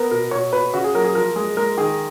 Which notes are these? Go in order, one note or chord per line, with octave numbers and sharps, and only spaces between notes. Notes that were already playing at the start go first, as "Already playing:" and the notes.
Already playing: B3 A#4
B2 A#4
B2 C#5
B2 B4
C#3 F#4
G#4
F#3 A#4
G#4
F3 A#4
G#3 G#4
G#3 A#4
D#3 G#4